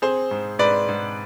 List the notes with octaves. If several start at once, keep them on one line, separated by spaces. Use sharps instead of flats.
C4 G#4 C5
G#2
G#2 B4 D5
G#2